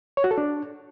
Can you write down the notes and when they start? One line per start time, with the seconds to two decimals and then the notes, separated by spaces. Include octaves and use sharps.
0.17 C#5
0.24 F#4
0.31 A4
0.38 D4